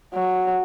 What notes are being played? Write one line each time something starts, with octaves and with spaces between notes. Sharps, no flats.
F#3